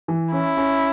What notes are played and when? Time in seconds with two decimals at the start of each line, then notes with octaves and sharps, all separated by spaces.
0.08 E3
0.32 C#4 E4
0.57 C#4